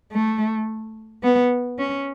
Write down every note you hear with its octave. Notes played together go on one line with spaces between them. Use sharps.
A3
B3
C#4